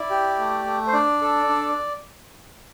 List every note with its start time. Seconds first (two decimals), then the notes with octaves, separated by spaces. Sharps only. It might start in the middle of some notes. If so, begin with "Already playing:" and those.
Already playing: E4 D5
0.10 G4
0.39 A3
0.65 A3
0.87 C5
0.93 D4 D5
1.21 A4
1.49 D4